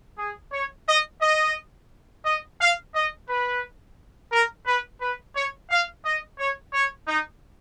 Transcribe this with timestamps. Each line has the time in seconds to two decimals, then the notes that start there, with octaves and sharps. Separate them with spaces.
0.18 G#4
0.53 C#5
0.88 D#5
1.22 D#5
2.25 D#5
2.60 F5
2.94 D#5
3.28 B4
4.32 A#4
4.67 B4
5.01 B4
5.35 C#5
5.70 F5
6.04 D#5
6.39 C#5
6.73 C#5
7.08 D#4